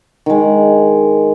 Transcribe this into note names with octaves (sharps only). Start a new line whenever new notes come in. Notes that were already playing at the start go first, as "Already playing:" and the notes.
D#3 G#3